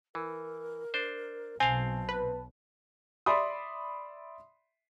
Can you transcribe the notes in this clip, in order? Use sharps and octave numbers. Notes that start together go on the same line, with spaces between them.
E3 A#4
D4 C5
B1 B2 C4 F5 G#5 A5
B4
D5 E5 B5 C6 D#6